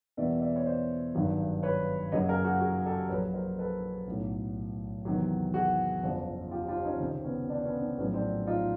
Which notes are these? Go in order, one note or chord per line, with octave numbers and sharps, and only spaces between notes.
E2 B2 G3 A#3 D5 E5
D5 E5
C#5
C5 D5
G#1 G2 D#3 F#3
B4 C#5
F#2 C#3 F#3 A#3 C#5 D#5
G#4 A#4
F#4 G#4
F#4 G#4
G4 A4
A#1 A#2 F#3 B4 C#5
A#4 C5
A4 B4
B1 A2 F#3
E2 C3 D#3 F#3
F#4 G#4
G1 F2 C#3
F4 G4
F4 G4
C#4 D#4
C#2 C3 D#3 C4
B3 C#4
C4 D4
B3 C#4
C4
A#1 A2 F#3 B3 C#4
C4 D4
D#4 F4